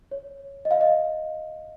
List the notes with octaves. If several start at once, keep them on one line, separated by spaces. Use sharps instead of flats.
C#5
D#5
F5
D#5